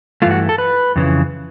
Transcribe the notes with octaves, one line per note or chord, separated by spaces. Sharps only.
G2 E3 A3 F4
F#4
A4
B4
F2 C#3 E3